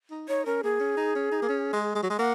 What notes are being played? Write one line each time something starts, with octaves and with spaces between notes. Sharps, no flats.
D#4
D#4 C#5
C#4 A#4
A#3 G#4
C#4
D#4
C#4
D#4
A#3
C#4
G#3
G#3
F#3
G#3
A#3 F#5